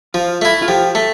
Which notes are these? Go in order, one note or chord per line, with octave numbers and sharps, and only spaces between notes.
F3 F4
A3 E4
F4
F3 G4
A3 A4